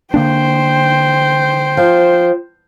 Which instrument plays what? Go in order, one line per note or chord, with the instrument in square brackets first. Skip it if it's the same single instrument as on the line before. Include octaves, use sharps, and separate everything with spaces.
[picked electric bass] D3 A#3 D4 [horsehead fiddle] C5 G5
[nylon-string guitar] F3